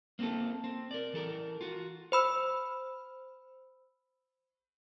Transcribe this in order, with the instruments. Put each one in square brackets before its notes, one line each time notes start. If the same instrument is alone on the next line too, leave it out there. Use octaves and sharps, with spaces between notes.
[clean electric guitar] A#3 C4 D#4 F4 A4
C4
A#4 D5
E3 A4 A#4
F4 F#4
[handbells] C5 B5 E6